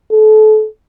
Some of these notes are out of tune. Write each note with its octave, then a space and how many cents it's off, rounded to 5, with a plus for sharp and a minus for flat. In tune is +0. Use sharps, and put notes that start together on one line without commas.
A4 -30